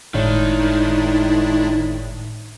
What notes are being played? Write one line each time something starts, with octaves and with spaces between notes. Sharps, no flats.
G1 A2 D#3 G#3 D4 E4 C#5